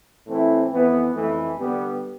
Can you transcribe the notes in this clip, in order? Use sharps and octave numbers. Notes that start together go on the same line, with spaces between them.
A2 E3 A3 C4 E4
F2 E3 B3 E4
F2 E3 A3
D3 G3 B3